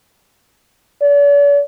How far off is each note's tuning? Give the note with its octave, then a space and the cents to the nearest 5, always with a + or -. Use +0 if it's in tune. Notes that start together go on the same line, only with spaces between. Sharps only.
D5 -45